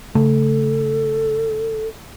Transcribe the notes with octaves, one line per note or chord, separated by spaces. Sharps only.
C#3 A3 A4